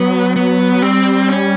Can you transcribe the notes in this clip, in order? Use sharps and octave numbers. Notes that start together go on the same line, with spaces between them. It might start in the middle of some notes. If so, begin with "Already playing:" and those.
Already playing: F#3 B3
B3
G3 C4
C#4